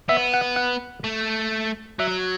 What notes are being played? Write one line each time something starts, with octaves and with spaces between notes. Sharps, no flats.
B3 E5
F#5
F#5
A3
F#3 E5